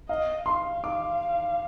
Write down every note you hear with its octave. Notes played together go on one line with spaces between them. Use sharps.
D#5 F5
F5 C6
D6